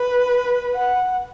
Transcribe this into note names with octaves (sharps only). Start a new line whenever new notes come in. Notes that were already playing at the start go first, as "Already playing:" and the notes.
Already playing: B4
F#5